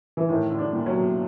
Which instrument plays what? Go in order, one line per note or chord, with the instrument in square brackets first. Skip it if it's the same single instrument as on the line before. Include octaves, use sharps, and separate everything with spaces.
[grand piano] E3
[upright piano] A2 [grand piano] D#3
[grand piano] D3
[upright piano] D4
[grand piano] A#2
[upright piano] F#3
[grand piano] B2